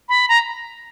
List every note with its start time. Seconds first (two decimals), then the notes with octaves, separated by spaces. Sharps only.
0.09 B5
0.29 A#5